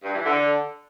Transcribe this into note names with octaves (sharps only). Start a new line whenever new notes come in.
G2
E3
D3